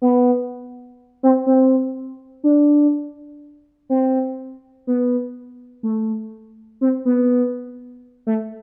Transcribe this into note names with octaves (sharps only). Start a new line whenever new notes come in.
B3
C4
C4
D4
C4
B3
A3
C4
B3
A3